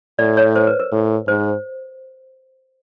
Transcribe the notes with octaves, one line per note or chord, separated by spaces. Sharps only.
A2 D5
C#5
C5
B4
A#4
A2
G#2 C5